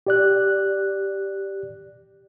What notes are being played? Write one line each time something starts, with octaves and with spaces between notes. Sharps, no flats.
G4 D5 F#6